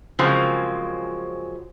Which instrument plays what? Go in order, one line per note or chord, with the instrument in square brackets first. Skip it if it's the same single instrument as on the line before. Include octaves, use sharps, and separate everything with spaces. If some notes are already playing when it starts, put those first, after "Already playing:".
[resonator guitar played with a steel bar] C#3 F3 F#3 G#3 A#3 C4